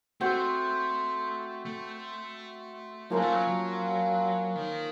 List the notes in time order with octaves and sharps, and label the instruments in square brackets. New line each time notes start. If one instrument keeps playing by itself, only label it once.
[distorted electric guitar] A3 [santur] C4 F#4 C5
[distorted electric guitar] A3
[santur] F3 A#3 C#4 F4 [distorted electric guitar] F#3
[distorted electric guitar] A3
F#3
F#3
D#3